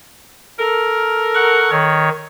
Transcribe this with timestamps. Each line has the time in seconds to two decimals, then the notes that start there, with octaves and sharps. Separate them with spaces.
0.59 A4 A#4
1.35 F#5 C#6
1.71 D#3 C#5